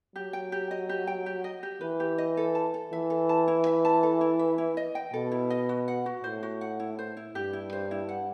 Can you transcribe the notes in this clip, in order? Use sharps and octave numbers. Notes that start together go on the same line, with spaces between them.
F#3 G4
G5
G4
D#5
G4
G5
G4
D#5
G4
E3 B4
G4
D#5
A4
A5
A4
E3 E5
A4
A5
E4
E5
A5
A4
E4
E5
E4
D#5
G5
B2 A4
E4
D#5
F#4
F#5
F#4
A2 C5
F#4
F#5
E4
C5
E4
G2 G4
E4
C5
E4
F#5